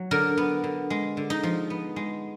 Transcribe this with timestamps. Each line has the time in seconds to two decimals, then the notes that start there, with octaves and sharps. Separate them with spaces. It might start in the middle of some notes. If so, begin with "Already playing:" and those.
Already playing: F#3
0.11 D3 A#4
0.37 B3
0.64 D3
0.90 G#3
1.17 D3
1.30 D#4
1.43 F3
1.70 B3
1.96 G#3